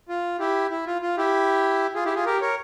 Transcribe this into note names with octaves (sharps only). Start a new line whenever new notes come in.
F4
E4 G4
E4
F4
F4
E4 G4
F4 G#4
E4 G4
F4 G#4
G4 A#4
A#4 C#5